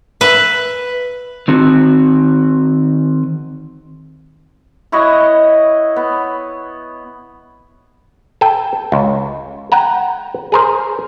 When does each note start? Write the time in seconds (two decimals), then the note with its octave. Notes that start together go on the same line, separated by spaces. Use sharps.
0.21 B4 E5
1.48 D#3 C4 F#4
4.92 E4 C#5 D#5 F#5
5.96 B3
8.41 A4 G5
8.92 C#2
9.72 F#5 G5 A#5
10.52 G#4 A#4 C5